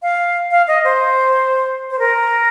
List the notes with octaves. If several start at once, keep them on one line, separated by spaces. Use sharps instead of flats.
F5
F5
D#5
C5
C5
A#4